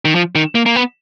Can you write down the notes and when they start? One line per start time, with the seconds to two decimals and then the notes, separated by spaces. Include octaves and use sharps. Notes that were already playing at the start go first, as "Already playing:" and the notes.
0.05 D#3
0.15 F3
0.35 D#3
0.55 A#3
0.66 A#3
0.76 B3